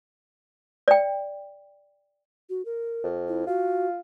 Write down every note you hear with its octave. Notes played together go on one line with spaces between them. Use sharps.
D5 G5
F#4
A#4
F2
E4
F4 F#4